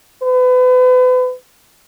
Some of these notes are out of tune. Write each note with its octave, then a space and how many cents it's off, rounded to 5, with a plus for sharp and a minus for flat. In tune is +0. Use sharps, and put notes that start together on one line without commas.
B4 +35